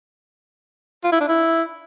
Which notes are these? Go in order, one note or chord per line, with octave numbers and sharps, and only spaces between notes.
F4
E4
D4
E4